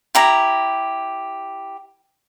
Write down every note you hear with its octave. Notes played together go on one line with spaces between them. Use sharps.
E4 G4 A#5